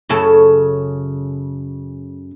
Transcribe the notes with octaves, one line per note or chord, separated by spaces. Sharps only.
F#2 C#3 A4